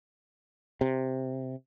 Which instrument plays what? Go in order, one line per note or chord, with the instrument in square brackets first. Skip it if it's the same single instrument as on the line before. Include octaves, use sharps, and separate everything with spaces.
[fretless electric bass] C3